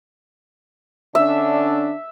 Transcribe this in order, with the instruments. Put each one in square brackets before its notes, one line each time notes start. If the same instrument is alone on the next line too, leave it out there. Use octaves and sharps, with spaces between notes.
[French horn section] D3 C#4 D4 [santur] E5